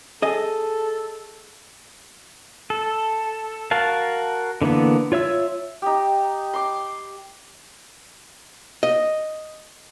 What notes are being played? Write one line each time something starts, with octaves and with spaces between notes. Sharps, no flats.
G#4 A4 D#5
A4
F#4 A#4 F5 A5
D3 E3 A#3 B3
F4 C#5 E5 E6
D#4 G4
C6 D6
D#5